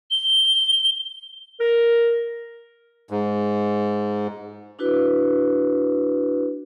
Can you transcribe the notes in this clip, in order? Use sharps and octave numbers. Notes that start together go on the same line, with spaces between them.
G7
A#4
G#2
D4 E4 F#4 B4